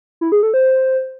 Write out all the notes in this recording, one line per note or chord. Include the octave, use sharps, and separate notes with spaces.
E4
G#4
A4
C5